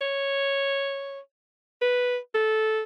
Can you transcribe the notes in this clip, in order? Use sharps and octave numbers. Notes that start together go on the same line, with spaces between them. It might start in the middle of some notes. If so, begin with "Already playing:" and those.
C#5
B4
A4